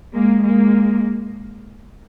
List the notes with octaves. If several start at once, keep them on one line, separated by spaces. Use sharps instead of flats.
G#3 A#3
G#3 A#3